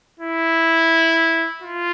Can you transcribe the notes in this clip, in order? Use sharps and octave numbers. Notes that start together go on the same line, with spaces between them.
E4
F4